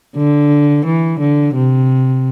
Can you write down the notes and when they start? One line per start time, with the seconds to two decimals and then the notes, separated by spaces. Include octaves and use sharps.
0.17 D3
0.86 E3
1.20 D3
1.54 C3